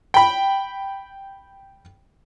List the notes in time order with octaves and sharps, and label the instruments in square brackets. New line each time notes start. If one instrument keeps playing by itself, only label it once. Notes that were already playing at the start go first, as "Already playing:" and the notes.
[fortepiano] G5 B5